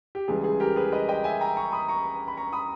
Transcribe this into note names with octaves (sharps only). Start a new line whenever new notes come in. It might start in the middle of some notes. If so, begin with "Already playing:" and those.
G4
C#2 C#3 E3 G3 G#4
G#4
G4 A#4
G#4 B4
B4 D#5
D#5 G5
E5 G#5
G5 A#5
A#5 C#6
B5 D#6
A#5 C#6
B5
A#5 C#6
B5 D#6